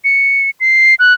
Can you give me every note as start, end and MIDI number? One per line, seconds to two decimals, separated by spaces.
0.04 0.50 97
0.60 0.95 96
0.99 1.14 90